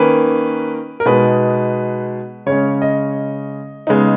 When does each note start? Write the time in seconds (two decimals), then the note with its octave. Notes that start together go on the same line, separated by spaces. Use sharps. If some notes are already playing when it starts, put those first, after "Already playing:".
Already playing: D#3 A#3 C#4 B4
1.00 A#4
1.06 B2 G#3 D#4 B4
2.46 C#3 G#3 C#4 C#5
2.82 D#5
3.87 C#3 G#3 B3 D#4